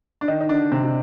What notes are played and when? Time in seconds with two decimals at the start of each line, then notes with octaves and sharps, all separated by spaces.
0.21 D4
0.28 D#3 D#4
0.41 D#4
0.49 D3 D4
0.72 C3 C4
0.83 C3